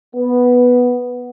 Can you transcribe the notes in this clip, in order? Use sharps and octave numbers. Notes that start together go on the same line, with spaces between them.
B3